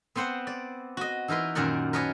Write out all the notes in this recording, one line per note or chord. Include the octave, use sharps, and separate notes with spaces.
B3 C4 C5 F#5
D5
F#4 D#5
E3 D#4 A#4 B4 C6
F#2 A#2 D#3 A#4 D5 F#5
A#4 B4 C#5 D#5 G#5 A5